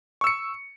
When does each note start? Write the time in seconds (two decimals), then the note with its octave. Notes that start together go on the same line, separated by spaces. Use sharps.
0.21 C#6
0.24 E6
0.27 C#7